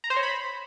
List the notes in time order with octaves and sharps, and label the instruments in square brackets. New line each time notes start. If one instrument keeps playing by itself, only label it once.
[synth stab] A#5
C5
C#5
B5